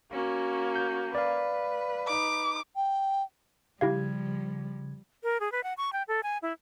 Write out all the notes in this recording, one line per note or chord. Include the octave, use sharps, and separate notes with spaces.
A#3 C#4 F#4
G6
B4 D5 F5
D#4 D6
G5
C#3 F3 G3 E4 G4 F5 G#6
A#4
G#4
B4
F#5
C#6
G5
A4
G#5
E4